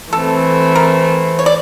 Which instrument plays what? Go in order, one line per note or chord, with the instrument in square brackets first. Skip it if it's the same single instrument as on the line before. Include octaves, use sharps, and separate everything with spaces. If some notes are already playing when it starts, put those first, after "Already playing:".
[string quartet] E3 A3 C4 [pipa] A4
[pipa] A#4
C#5
D5